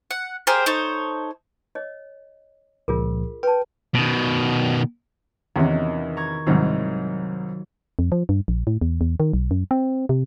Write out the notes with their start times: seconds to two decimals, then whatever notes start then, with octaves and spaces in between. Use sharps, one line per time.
0.11 F#5
0.47 G4 G#4 A#4 C5
0.66 D#4 A4 C5 C#5
1.75 C#5 D#5
2.88 C#2 A#2 F3 F4 G#4 A#4
3.43 B4 G5 A5
3.95 B2 D#3
5.56 E2 C3 D#3 C#4 F#4
6.17 A#5 C#6 G#6
6.47 C2 G#2 D#3 F#3 F4
7.99 F2
8.12 F3
8.29 G2
8.48 A#1
8.67 A2
8.81 E2
9.01 E2
9.20 D#3
9.33 B1
9.51 F#2
9.71 C4
10.09 C3